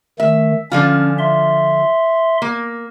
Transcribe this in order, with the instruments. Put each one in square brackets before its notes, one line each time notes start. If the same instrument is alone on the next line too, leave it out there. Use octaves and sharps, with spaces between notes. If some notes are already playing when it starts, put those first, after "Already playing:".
[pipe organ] D#3 A3 [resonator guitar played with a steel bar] E5
[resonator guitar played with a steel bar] D3 F3 F4 [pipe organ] C#4
[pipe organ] E5 C6
[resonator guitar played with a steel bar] A#3